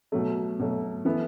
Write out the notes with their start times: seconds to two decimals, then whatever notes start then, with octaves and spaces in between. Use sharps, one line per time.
0.12 B2 F#3 A3
0.59 B2 F#3 A3
1.05 E3 B3 E4 A4